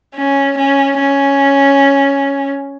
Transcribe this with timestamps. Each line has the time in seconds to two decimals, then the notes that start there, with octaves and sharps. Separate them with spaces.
0.15 C#4
0.58 C#4
0.99 C#4